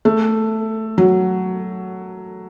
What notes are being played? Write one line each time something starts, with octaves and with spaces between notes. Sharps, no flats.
A3
F#3